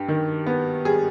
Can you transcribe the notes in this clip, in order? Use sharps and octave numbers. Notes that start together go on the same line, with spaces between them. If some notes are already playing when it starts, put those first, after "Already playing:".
Already playing: G2 G4
D#3
B3
G3 G#4